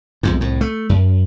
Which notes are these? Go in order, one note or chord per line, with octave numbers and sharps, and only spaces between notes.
B1 F2 G#2
C2 A2
A3
F#2